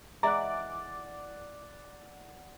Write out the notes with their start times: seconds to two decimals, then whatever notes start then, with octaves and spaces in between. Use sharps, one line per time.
0.23 E3 G#3 E4 D5 F#5 A#5 D6